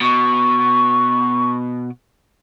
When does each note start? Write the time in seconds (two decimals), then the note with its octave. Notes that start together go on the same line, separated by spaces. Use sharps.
0.01 B2 C#6